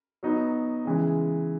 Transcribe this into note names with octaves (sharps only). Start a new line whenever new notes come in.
F#3 B3 D#4
C#3 E3 G#3